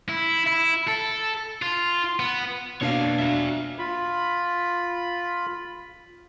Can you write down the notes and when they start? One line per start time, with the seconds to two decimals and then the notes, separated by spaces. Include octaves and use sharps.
0.09 E4
0.47 E4
0.88 A4
1.62 F4
2.20 B3
2.81 B2 A#3 D4 C#5 F5
3.19 F#4 E5
3.79 F4 B5